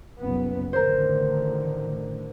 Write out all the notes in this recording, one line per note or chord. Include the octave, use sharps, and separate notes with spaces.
F#1 C2 B3
A1 D3 D#3 A#4 C5